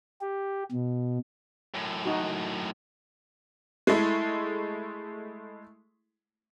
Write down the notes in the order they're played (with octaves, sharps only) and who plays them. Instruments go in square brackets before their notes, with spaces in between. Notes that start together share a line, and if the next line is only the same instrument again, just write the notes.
[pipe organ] G4
B2
[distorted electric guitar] F#2 A2
[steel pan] D#4 F#4
[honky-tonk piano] G#3 A3 E4